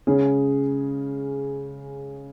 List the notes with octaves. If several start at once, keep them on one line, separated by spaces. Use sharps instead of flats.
C#3 G#3 C#4 G#4